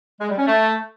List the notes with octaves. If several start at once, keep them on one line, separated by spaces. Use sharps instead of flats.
G#3
G3
C#4
A3